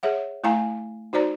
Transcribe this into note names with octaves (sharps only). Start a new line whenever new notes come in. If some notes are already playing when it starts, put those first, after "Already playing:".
G#4 C#5 E5 F#5
A3 E4 F5 G#5 A#5
D#4 F#4 C5 D5 A#5